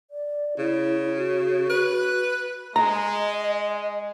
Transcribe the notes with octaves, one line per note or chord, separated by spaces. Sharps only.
D5
C#3 E4
F#4
B4
G#3 D#5 A#5